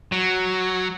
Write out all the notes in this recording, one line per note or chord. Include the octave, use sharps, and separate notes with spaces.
F#3